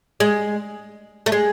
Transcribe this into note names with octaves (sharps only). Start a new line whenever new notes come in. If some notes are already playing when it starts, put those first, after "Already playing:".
G#3
A3
G#3